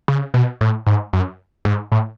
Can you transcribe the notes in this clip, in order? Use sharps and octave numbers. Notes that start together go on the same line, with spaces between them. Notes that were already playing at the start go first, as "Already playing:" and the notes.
C#3
B2
A2
G#2
F#2
G#2
A2